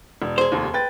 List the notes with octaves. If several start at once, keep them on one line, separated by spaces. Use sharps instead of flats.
E1
G#4 C5
F1 D#2
B4 G5 A6